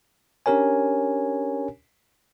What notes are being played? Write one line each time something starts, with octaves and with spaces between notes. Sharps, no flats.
C#4 D4 G4 A#4 C#5 G#5